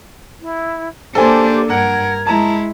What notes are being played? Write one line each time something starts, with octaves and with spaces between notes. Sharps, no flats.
E4
A#3 D4 G4 A4 C5 G#5
G2 A#4 F#5 G#6
G#3 E4 A5 A#5